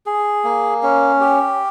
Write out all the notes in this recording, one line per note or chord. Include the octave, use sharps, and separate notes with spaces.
G#4
A#3
C#4
G4